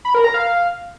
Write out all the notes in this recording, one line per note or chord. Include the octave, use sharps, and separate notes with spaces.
B5
A#4
A#5
F5